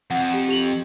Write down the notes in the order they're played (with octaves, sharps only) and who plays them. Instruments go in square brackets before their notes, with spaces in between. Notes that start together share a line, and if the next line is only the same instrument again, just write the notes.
[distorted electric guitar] F2 [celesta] F#5
[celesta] G4
G4 F7 F#7